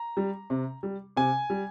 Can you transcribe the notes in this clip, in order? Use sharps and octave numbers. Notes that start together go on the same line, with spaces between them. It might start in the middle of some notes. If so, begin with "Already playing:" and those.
Already playing: A#5
G3
C3
G3
C3 G#5
G3